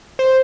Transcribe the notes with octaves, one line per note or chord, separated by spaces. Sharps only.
C5